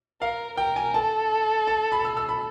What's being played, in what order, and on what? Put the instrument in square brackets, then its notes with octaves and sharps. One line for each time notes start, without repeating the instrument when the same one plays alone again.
[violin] A#4 [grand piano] F5
[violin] A#4 [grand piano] G5
[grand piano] G#5
[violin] A4 [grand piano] A5
[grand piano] A5
B5
E6
E6
B5